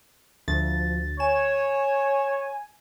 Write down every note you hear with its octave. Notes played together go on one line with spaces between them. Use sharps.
D2 F3 A6
C#5 G#5 E7